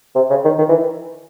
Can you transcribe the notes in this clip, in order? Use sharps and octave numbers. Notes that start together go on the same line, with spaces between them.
C3
C#3
D#3
D#3
E3